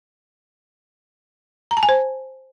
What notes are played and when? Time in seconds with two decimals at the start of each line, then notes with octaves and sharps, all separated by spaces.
1.71 A#5
1.77 A5
1.83 G#5
1.89 C5